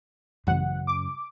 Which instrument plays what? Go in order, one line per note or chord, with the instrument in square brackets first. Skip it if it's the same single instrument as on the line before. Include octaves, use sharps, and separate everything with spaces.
[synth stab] A1 F#5 [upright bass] F#2 C#3
[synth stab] D6